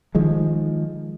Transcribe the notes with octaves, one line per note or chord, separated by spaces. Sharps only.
D#3 F3 G#3